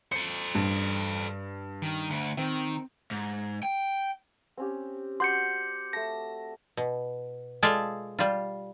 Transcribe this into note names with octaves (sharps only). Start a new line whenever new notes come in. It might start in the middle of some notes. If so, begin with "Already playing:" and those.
A4 C5 C#7
G2
D#3
D2
D#3 C4
G#2
G5
C4 C#4 G4
F#4 D5 C6 G6 C#7
A3 A5 A#6
B2
G#3 F4 A4 D5 E5 F5
G3 F4